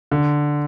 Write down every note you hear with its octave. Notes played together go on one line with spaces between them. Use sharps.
D3